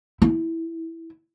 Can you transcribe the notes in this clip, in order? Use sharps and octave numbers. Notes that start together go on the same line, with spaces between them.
E4